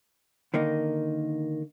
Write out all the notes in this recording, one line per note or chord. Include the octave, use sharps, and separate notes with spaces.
D3 D#3 A#3 D#4